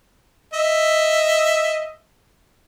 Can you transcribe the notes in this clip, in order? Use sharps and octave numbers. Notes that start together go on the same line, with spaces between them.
D#5 E5